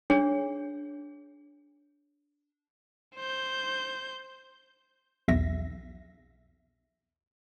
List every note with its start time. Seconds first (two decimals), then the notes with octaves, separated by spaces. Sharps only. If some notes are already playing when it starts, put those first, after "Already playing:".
0.10 D4 G#4 C#5
3.16 C5 G6
5.28 B1 E2 E5 A#6